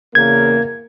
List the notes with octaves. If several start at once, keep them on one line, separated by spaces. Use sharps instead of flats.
E2 C#3 A#3 G#6